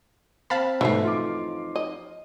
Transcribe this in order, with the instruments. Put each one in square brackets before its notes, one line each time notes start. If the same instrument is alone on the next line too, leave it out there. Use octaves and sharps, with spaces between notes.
[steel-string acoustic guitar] C4 [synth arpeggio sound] F5 A5 B5
[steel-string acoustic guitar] F2 C#4 D#4 [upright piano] G#2 C7 [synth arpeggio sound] B2 [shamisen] E3 A3
[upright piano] F4 D6
[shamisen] D#5